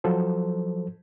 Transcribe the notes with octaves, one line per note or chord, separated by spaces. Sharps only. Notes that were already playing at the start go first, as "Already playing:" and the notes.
F3 F#3 A4 C5